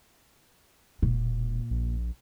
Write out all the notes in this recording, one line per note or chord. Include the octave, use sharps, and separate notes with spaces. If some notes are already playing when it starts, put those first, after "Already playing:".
E1 A#2
A#1